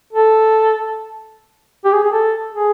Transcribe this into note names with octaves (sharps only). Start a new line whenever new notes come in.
A4
G4
G#4
G#4
A4
G#4